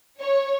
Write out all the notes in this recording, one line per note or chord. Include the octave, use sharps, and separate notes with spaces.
C#5